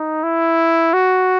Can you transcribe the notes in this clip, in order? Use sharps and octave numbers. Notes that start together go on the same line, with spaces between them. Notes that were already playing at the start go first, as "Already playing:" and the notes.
Already playing: D#4
E4
F#4